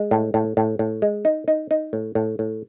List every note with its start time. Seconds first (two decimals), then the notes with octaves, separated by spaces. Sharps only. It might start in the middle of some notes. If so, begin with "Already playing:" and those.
Already playing: G#3
0.11 A2
0.34 A2
0.57 A2
0.79 A2
1.02 G#3
1.25 D#4
1.48 D#4
1.71 D#4
1.93 A2
2.15 A2
2.39 A2